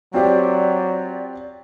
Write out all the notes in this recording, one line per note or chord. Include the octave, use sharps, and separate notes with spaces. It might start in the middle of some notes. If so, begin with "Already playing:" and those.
F#3 C4 F4 G4 D5